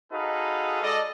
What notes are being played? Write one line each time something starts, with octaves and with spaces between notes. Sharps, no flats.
D#4 F#4 G#4 A4 B4 F5
G#3 A4 D5 D#5